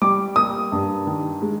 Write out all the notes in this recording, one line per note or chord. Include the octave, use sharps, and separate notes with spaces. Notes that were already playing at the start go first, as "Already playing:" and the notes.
G3 D6
A#3 D#6
G2
D#3
G#3